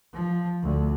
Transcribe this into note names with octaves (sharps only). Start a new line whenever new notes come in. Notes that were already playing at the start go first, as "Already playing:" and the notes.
F3
D2